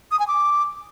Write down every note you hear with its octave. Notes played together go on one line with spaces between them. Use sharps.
D#6
G#5
D6